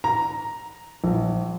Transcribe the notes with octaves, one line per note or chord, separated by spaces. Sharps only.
A#5
A#1